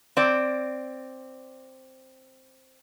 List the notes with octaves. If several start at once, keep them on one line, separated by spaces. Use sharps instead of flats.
C4 D5